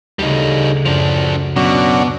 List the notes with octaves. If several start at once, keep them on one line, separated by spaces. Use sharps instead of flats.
D2 C#3 G3 D#4
F#2 F3 D4
B2 F#3 C#4 D4